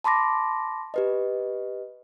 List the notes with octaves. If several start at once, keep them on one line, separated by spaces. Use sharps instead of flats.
A5 B5 C6 D6 A#6
G4 B4 D#5